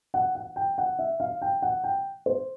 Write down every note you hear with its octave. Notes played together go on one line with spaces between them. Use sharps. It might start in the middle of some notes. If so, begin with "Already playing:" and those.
F#5
F#5
G5
F#5
E5
F5
G5
F#5
G5
C5